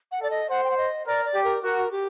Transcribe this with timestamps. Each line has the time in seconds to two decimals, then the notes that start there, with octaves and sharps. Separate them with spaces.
0.12 F#5
0.21 A4 D5
0.30 D#5
0.50 C5 F#5
0.64 G5
0.71 F#5
0.77 D#5
1.07 A#4 D5
1.25 D5
1.35 G4
1.44 A#4
1.63 F#4 A#4
1.92 G4